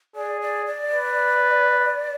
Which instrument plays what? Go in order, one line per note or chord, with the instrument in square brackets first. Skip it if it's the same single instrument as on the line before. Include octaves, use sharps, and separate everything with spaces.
[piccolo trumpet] G#4 [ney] D5
[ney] D5
D5
[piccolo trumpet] B4